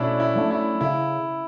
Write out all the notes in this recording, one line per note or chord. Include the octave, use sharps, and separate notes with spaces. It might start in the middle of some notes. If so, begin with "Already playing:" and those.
Already playing: B2 A3 C#4 D4 E4
E4
F#3 A3 D4
E4
C#3 E4